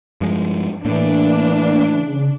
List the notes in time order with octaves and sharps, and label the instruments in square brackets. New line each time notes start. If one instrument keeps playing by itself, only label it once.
[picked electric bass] G2 F3 G#3
[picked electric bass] A2 [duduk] E3 [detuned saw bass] A#3 [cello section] D4
[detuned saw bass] C#3